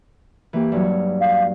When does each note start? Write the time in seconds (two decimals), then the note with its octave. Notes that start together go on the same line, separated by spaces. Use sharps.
0.53 E3 A#3 G4
0.72 G2 F#3 C#5
1.21 F5